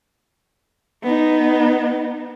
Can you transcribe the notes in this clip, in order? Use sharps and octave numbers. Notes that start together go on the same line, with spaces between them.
B3 D#4